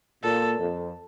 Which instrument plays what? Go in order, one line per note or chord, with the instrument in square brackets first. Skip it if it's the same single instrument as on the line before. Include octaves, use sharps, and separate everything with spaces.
[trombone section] A#2 [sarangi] A4
[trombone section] F2